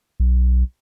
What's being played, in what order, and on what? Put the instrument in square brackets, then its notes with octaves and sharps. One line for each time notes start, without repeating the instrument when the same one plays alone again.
[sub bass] B1